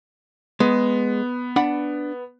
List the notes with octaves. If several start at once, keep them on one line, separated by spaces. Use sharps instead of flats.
G#3 B3
D4 F#5 B5